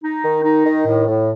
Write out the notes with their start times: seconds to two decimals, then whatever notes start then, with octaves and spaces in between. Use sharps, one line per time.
0.03 D#4
0.24 D#3
0.44 D#4
0.66 D#3
0.86 A2
1.08 A2